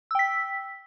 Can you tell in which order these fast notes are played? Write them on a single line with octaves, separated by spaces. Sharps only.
E6 G5 B6